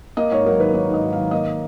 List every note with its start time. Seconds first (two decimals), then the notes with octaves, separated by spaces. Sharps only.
0.17 A#3 D#5
0.31 G#2 C#5
0.46 F#3 A#4
0.60 D#3 B4
0.74 A#3 C#5
0.89 G#2 D#5
1.04 F#3
1.13 D#3 F5
1.31 A#3 D#5